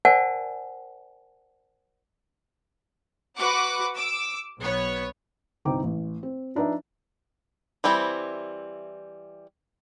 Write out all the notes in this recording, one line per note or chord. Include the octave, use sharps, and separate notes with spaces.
A#4 C5 D5 F#5 G#5 A5
F#4 B4 F#5 D6
D6 E6
B1 B3 C#5
G1 C2 C4 D#4 G5 D6
A1
C4
F3 D4 D#4 B4 E5
E3 G3 C4 E4